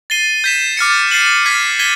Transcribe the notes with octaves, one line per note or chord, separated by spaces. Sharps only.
A6 C7 D#7 G7
G6 B6 E7
D6 F6 A6 C#7
A6 C7 D#7 F#7
F6 G#6 B6
G#6 B6 D#7 G7